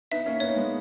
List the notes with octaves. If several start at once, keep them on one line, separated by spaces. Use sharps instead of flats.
B3 D#4 E5
A#3 C#4
B3 D#4 C#5
G#3 B3